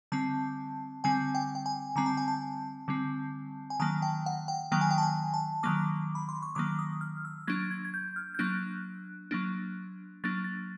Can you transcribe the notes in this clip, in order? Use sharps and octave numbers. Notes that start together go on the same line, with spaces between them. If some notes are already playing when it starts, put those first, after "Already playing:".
D3 G3 C4 A5
D3 G3 C4 G#5
G5
G5
G#5
D3 G3 C4 A#5
A5
G#5
A5
D3 G3 C4
G#5
D#3 F#3 A#3 A5
G5
F#5
G5
D#3 F#3 A#3 G5
G#5
G5
A5
G#5
A5
D#3 F#3 A#3 D6
B5
C6
C#6
D#3 F#3 A#3 D6
D#6
F6
E6
F#3 A#3 D4 G#6
G#6
G#6
G6
F6
G6
F#3 A#3 D4 F#6
F#3 A#3 D4
F#3 A#3 D4 A6
A6